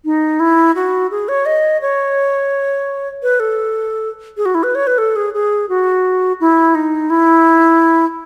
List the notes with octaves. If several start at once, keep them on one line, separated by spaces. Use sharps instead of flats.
D#4
E4
F#4
G#4
C#5
D#5
C#5
B4
A4
G#4
F#4
E4
B4
C#5
B4
A4
G#4
G#4
F#4
E4
D#4
E4